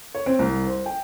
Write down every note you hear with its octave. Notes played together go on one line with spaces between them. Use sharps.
C#5
C4
C2
C5
G5